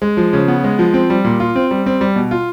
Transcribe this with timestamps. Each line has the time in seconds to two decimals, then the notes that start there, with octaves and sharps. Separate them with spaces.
0.02 G#3
0.17 F3
0.33 C#3
0.48 B3
0.64 G#3
0.79 F3
0.94 C4
1.10 G3
1.24 A#2
1.40 F4
1.56 C4
1.71 G3
1.86 C4
2.01 G3
2.16 B2
2.31 F4